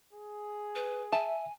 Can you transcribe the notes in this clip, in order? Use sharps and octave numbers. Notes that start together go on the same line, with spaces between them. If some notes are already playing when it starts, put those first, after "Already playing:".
G#4
B4
E5 G#5 A5